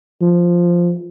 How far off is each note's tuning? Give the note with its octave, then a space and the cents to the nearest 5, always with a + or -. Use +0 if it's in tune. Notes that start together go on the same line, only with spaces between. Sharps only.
F3 +0